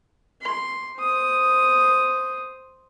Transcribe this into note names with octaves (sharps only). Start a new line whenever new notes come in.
C6
C5 D#6